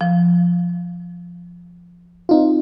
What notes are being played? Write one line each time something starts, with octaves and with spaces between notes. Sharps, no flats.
F3
C4 D#4 F4